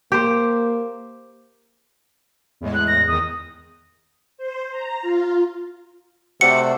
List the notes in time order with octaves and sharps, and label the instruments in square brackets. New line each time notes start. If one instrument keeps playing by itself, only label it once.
[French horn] A#3 [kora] G4 C5
[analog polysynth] E2 A2 G#3
[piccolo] F#6
A#6
[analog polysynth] E2 D#3 [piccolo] D#6
[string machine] C5
A#5
F4
[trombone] C3 [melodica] A3 A4 [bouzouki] F#4 C5 D5 [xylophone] C#7